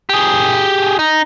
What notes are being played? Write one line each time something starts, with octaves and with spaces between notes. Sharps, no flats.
G4 G#4
D#4